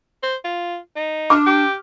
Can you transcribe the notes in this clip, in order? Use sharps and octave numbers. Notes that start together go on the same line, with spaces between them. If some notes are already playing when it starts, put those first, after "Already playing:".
C5
F4
D#4
D4 D6 F6
G4